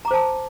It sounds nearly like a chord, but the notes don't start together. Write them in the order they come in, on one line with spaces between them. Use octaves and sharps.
A#5 D6 C5 A5